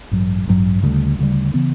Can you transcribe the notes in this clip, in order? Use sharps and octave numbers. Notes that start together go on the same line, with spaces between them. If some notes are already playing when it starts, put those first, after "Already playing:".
A1 G2 F#3
A1 G2 F#3
D2 C#3 G3
D2 C#3 G3
C#3 E3 B3